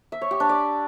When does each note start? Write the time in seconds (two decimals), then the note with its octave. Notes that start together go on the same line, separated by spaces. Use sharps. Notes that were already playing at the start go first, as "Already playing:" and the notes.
0.12 E5
0.21 C#5
0.31 G4
0.40 D4
0.49 D5